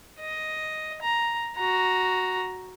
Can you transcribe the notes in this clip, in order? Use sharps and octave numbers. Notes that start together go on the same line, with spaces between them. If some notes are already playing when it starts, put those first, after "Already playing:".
D#5
A#5
F#4 A#5